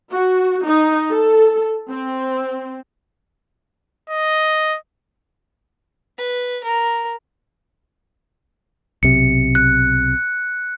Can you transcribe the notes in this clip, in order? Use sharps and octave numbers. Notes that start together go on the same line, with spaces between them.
F#4
D#4
A4
C4
D#5
B4
A#4
B1 C3 C#7
F#6